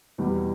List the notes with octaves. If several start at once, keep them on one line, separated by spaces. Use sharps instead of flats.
E2 B2 G3